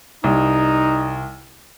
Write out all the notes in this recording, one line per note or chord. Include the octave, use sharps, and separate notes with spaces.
C2 D#4